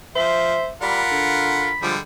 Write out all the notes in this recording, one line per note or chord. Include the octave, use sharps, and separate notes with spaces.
F3 C5 E5
G3 F4 A#4 F#5 B5
D3
D3 F3 G3 G#3